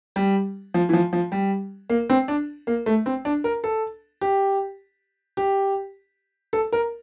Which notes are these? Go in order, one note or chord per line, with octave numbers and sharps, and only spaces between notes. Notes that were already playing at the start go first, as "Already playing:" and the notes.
G3
F3
E3
F3
F3
G3
A#3
C4
D4
A#3
A3
C4
D4
A#4
A4
G4
G4
A4
A#4